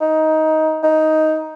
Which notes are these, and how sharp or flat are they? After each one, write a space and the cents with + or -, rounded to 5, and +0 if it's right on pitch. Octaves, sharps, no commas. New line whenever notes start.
D#4 +15
D#4 +10